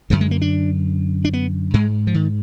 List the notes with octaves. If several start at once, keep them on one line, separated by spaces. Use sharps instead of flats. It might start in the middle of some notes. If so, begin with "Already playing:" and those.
F#2 D3 F3
G#3
A#3
D4
D4
B3
G#2 G#3
F3
D#3